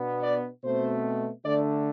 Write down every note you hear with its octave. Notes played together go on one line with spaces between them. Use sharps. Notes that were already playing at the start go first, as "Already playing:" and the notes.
Already playing: B2 B3 D4
D5
B2 A3 C4 C5
D3 A3 D4 D5